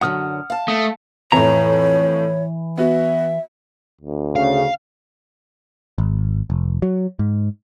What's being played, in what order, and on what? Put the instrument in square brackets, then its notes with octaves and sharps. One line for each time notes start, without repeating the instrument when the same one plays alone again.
[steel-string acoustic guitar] F#2 D3 F#3 [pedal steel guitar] F#5 D#6 F6
[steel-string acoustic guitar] F5 A5
[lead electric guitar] A3 [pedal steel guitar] D#6
[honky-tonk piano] F2 A2 [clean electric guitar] E3 A#5 [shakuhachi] C#5
[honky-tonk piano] B3 F#4 [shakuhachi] E5
[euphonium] D2
[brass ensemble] C#3 [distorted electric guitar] F5
[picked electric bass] G#1
F1
F#3
G#2